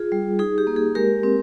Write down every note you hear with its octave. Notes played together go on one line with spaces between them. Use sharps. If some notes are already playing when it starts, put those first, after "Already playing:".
Already playing: F4 G#4
G3
D#4 G#4
G4
A#3
G#4
G#3 G4 A#4
C4